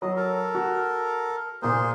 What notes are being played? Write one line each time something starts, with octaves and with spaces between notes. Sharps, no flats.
F#3 D#5
A4 A#4
F#4
A#2 A#3 G#4 C5